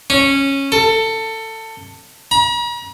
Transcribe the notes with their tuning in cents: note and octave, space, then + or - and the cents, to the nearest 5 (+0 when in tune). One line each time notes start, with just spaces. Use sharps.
C#4 -10
A4 +20
A#5 +45